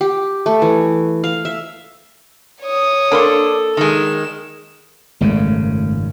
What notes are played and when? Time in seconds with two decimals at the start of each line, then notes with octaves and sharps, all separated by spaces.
0.01 G4
0.46 A3
0.62 E3
1.24 F5
1.45 E5
2.62 C#5 D#6
3.12 A#3 D4 A4 B5 C6
3.77 D#3 G#3 E7
5.21 G#1 F#2 C#3 G#3 A3